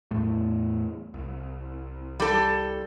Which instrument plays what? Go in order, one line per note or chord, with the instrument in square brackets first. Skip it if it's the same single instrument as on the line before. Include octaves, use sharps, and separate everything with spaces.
[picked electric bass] E2 A2 A3
C2
[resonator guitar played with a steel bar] G3 A4